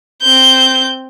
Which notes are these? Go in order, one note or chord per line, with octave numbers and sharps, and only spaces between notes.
C4 G6